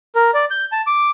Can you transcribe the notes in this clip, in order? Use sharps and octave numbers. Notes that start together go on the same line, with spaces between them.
A#4
D5
G6
A5
D6